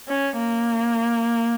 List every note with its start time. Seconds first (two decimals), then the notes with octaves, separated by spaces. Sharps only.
0.08 C#4
0.39 A#3